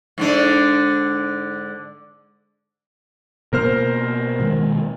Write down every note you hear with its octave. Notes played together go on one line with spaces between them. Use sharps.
G#2 D3 D4
B2 A#3 B3 A#4 C5 F6
B2 D#3 G#3